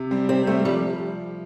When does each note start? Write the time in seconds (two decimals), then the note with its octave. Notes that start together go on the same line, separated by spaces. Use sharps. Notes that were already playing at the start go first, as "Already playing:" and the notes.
Already playing: C3
0.11 G3 C4
0.28 C3 C4
0.47 G3 A3 C4
0.65 F3 G3